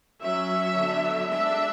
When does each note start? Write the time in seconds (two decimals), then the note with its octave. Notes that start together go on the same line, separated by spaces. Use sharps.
0.22 F#3 C#4 E5
0.75 D3 F#3 B3 D4
1.29 G#3 D4 E5